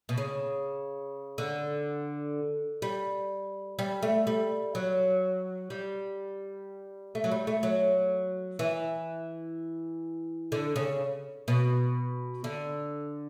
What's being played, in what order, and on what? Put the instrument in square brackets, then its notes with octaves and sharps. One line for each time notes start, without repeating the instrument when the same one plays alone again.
[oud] B2
C#3
D3
G3
G3
A3
G3
F#3
G3
A3
F#3
G3
A3
F#3
E3
D3
C#3
B2
D3